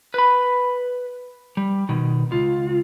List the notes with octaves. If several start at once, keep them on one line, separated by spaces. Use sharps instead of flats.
B4 B5
G3
B2 D#3
C#2 F4